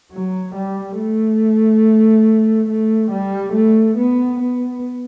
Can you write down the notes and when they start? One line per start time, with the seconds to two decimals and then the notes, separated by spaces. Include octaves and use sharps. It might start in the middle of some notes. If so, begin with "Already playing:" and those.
0.12 F#3
0.54 G3
0.98 A3
2.68 A3
3.11 G3
3.53 A3
3.96 B3
4.40 B3